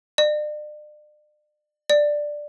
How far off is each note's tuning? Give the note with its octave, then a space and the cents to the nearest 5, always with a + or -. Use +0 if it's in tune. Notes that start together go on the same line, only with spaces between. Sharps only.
D5 +40
D5 +5